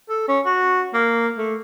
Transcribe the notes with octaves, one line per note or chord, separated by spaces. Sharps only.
A4
C#4
F#4
A#3
A3